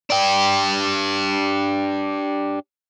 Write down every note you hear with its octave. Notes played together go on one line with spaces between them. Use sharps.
D4 G4